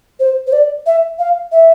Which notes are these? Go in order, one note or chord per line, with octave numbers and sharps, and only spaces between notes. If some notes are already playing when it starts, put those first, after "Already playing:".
C5
C5
D5
E5
F5
E5